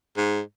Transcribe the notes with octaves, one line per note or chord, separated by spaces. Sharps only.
G#2